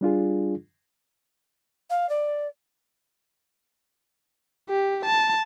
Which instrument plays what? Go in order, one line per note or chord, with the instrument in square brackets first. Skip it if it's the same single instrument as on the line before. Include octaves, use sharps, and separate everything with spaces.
[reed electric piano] G3 D4 F4 G#4
[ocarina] F5
D5
[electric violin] G4
A5